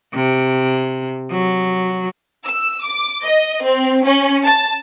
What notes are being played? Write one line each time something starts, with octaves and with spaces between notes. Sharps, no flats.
C3
F#3
E6
D6
D#5
C4
C#4
A5